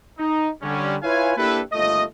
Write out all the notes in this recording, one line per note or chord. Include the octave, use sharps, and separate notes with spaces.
D#4
D3 G3 C#4
E4 F4 B4 C#5 F5 G#5
A#3 D4 E4 G4 A4 B4
G1 D#2 A3 F4 D#5